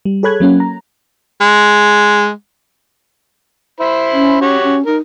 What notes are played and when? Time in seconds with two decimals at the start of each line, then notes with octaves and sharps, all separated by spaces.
0.05 G3
0.23 G#4 A4 C#5 B5 F#6 G#6
0.40 F#3 A#3 C#4
0.60 A#5
1.41 G#3
3.80 E4 C5 B5
4.12 C#4
4.41 F#4 G4 C#5
4.63 C#4
4.86 D#4 A#4